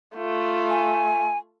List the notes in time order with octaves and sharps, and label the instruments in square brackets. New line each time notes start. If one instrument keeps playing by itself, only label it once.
[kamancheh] A3 F4
[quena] G#5